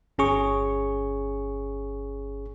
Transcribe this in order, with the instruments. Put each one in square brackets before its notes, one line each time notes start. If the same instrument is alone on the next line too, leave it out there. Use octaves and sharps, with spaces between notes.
[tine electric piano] G1 C#4 G#4 C#6